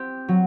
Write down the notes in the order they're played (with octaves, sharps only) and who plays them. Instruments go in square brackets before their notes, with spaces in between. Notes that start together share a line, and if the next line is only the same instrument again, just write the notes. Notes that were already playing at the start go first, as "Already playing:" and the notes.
Already playing: [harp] C4 G4
F#3